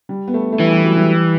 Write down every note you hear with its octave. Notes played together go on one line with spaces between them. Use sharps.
G3
B3
A3
A3
E3 G3
G3
F#3
G3